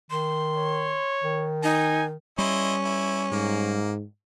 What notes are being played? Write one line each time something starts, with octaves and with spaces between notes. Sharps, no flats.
D#3 C6
C#5
D#3
D#4 G#5
G3 C#4 E4 D#5 C6
E4
G#2 A#3